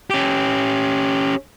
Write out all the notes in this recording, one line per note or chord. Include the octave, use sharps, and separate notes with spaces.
C#4 G4